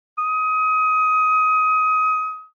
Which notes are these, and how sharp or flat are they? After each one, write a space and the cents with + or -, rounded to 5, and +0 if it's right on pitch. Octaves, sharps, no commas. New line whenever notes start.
D#6 +25